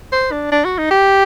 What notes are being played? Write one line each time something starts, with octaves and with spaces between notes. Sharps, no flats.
C5
D4
D4
F#4
D#4
G4